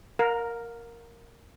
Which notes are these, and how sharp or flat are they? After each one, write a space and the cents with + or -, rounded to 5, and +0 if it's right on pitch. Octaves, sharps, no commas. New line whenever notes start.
A#4 +0 F5 +40